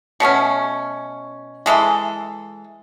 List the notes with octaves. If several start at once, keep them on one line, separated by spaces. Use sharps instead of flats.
B2 A3 B3 C#4
E3 G#3 E4 A4